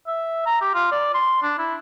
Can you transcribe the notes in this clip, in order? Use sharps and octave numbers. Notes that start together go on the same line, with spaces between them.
E5
A#5
G4
F4
D5
C6
D4
E4